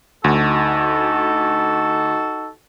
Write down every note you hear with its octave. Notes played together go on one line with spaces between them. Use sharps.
D2 D#4 F#4 A4